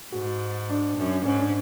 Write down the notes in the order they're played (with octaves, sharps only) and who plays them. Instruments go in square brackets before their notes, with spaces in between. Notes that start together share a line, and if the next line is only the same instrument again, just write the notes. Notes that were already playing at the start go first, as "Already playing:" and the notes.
[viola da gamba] G#2 [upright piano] F#4
[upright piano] D4
[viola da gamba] F#2
[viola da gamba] G#2 [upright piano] C#4
[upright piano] D4